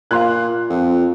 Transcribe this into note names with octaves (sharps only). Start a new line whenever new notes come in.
A#2 F5 C6 F#6
F2